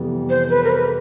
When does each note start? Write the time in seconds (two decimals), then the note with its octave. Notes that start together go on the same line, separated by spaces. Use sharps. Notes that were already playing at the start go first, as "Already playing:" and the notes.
Already playing: F2 C3 E3 G3 B3
0.30 C5
0.50 B4
0.64 A#4
0.70 B4